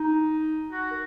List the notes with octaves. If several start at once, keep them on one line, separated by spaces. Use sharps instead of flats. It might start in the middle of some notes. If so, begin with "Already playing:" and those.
Already playing: D#4
F#4
A#4